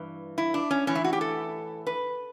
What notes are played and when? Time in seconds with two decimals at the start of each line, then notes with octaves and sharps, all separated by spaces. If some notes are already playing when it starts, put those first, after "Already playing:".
Already playing: G2 E3
0.38 E4
0.54 D4
0.71 C#4
0.87 A2 E3 C#4
0.95 E4
1.04 F#4
1.13 G4
1.21 A4
1.87 B4